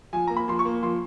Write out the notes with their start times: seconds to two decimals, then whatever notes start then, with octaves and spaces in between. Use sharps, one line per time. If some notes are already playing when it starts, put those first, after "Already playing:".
0.13 F3 G#5
0.28 A#3 A#5
0.37 B5
0.48 F3 C6
0.59 C#6
0.65 A#3
0.83 F3 C6